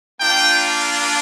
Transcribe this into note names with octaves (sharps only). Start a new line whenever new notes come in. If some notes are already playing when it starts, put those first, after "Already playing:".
A#3 D4 F4 G5